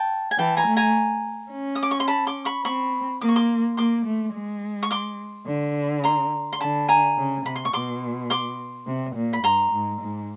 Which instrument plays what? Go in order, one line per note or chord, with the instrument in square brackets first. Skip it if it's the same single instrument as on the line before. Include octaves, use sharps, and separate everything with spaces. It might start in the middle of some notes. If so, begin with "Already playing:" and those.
Already playing: [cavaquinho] G5 A5
G#5
[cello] E3 [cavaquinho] G5 A5
[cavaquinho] G#5 A#5
[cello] A3
[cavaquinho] G#5 A#5
[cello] C#4
[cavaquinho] D#6
D6
C#6
C6
A5 B5
C6 D6
B5 C#6
[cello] C4 [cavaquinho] B5 C#6
[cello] A#3 [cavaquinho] D6
[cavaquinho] C#6
C6 D6
[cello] A#3 [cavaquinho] C6 D6
[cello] A3
G#3
[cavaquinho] C#6
C6 D6
[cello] D3
[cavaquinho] A#5 C6
C6
[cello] D3 [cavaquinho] A5 B5
[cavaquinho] G#5 A#5
[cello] C#3
[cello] C3 [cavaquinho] B5
[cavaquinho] C6
C#6
[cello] B2 [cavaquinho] C6 D6
[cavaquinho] C6 D6
[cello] C3
A#2
[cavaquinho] B5
[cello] G2 [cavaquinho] A#5 C6
[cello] G#2
G#2